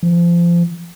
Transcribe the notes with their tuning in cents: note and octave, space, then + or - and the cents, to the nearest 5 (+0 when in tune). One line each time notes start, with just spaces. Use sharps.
F3 -25